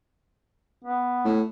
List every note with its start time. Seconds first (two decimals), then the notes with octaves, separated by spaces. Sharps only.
0.84 B3
1.25 A2